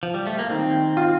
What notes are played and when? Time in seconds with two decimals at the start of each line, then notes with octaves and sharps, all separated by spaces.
0.03 F3
0.14 G3
0.27 A3
0.39 A#3
0.50 D#3 C4
0.97 F4